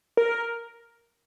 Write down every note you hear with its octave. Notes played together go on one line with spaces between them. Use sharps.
A#4